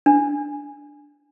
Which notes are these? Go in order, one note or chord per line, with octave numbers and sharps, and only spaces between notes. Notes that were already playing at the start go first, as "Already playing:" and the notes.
D4